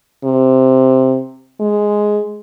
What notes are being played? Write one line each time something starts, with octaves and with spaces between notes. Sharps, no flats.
C3
G#3